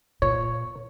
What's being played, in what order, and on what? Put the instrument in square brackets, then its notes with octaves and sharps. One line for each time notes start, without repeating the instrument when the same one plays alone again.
[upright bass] A#2 [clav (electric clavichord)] C#5